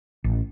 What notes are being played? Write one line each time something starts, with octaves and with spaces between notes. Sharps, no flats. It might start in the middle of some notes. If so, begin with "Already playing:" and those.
A1